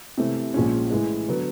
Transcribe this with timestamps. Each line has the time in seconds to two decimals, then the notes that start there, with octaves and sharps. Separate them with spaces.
0.17 C3 E3 A3
0.54 A#1 A#2 F3 G#3 C#4
0.90 A2 E3 G#3
1.28 D3 F#3 B3